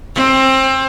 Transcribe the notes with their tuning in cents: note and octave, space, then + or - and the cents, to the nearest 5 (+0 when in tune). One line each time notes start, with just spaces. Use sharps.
C4 +25